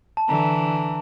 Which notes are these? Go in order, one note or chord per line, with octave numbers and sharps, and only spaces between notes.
A5
D3 E3 A#5